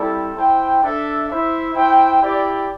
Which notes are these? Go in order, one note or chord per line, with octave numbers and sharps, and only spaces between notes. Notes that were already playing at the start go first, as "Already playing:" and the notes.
Already playing: G3 C4 E4 A4 D5
E4 C5 G5
D4 A4 E5
E4 C5 E5
E4 C5 G5
E4 G4 D5